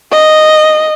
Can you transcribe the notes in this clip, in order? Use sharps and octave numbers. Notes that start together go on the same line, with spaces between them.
D#5